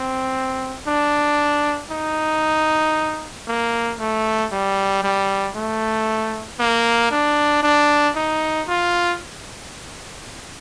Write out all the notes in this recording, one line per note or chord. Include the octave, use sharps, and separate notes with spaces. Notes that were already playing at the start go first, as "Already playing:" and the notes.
Already playing: C4
D4
D#4
A#3
A3
G3
G3
A3
A#3
D4
D4
D#4
F4